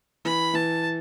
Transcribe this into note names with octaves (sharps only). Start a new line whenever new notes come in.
E3 B5
E3 A5